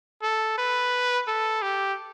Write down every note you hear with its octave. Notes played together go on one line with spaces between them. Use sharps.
A4
B4
A4
G4